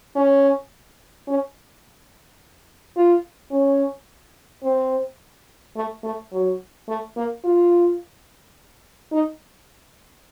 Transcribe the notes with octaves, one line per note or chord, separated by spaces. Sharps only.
C#4
C#4
F4
C#4
C4
A3
A3
F#3
A3
A#3
F4
D#4